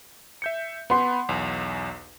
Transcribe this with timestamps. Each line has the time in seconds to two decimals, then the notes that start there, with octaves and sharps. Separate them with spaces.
0.42 E5 G6 C#7
0.90 B3 F#5 B5 C6
1.29 B1 E2